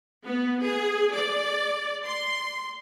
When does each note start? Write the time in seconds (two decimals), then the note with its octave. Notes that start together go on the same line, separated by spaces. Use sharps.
0.25 B3
0.62 G#4
1.13 D5
2.04 C6